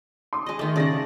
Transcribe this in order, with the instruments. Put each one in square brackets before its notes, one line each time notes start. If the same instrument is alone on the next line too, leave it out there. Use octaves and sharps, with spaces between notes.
[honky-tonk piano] C6 D6 D#6
[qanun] G#3 D#5
D#3 A3
[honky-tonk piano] C#3 G#4 A#6 [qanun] D5 F#5